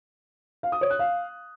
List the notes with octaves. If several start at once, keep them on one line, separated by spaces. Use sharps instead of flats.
F5
D#6
C#5
F#6
F5